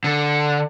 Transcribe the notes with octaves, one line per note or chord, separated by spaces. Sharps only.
D3